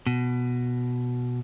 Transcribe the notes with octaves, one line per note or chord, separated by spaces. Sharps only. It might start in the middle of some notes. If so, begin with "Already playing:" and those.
B2